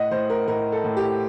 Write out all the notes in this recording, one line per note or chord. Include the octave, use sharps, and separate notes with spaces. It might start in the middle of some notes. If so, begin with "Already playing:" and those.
Already playing: A2 D#5 F#5
A2 C5
A#4
A2 A#4
A4
A2
G4